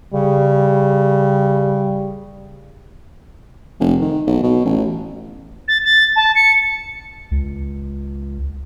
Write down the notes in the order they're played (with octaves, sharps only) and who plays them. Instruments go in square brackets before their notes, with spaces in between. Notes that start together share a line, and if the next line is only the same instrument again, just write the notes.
[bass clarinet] C#3 [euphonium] G3
[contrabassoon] F1
D#3
B1
B2
A1
[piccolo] A6
A6
A5
C#7
[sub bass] C#2